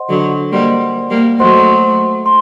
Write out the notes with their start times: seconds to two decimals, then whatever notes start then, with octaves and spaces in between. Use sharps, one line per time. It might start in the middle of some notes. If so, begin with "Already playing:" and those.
Already playing: C5 D#5 F#5 C6
0.09 D3 F#3
0.52 G3 A#3 C5 D#5 F#5 C6
1.10 G3 A#3
1.39 F#3 A3 C5 D#5 F#5 C6
2.26 C6